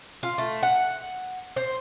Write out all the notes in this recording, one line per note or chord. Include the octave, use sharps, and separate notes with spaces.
F4
A3
F#5
C5